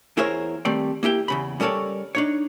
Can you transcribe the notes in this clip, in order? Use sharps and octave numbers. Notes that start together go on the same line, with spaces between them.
E2 E4 G#4 A#4 C5 C#5
D#3 G3 A3 C4 D5
A#3 E4 G4 G5
E2 C#3 B5
G3 C#4 A4 A#4 C#5 D5
D4 D#4 C#5